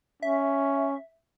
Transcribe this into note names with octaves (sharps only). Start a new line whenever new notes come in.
C#4 E5